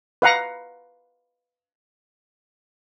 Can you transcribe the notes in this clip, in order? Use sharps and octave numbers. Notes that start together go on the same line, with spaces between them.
B4 F5 F#5 A#5